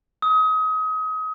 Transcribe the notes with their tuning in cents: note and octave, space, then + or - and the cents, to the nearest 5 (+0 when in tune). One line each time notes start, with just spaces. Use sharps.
D#6 +30